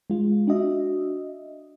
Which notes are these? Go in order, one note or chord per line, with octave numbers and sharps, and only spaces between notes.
G#3 F4
D4 F#4 D#5 E5